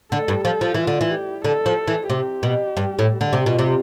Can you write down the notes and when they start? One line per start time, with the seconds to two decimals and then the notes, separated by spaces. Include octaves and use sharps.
0.12 D3 A4
0.28 G2
0.45 F3 A4
0.61 F3
0.74 E3 F4
0.87 D3
1.01 E3
1.11 G4
1.44 D3 A4
1.66 F3
1.88 E3
2.10 C3 G4
2.43 B2
2.77 G2
2.99 A2
3.21 D3
3.33 C3
3.42 B2 F4
3.59 C3